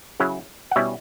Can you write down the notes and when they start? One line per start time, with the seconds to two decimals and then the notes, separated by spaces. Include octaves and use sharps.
0.20 C#3 F#3 C#4 E4
0.71 F#5
0.76 B2 G3 C#4 E4 E5